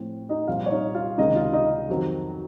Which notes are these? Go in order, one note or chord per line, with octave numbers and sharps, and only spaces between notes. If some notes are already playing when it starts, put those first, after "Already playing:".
Already playing: A2 F3 C4
D#4 D#5
C2 A#2 F3 F4 F5
C#5
D#4 D#5
F4 F5
C#2 C3 D#3 D#4 D#5
F4 F5
D#4 D#5
F2 D#3 F#3